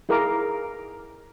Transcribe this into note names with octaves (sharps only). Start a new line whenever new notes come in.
E4 G#4 A#4 F5 A#5 D6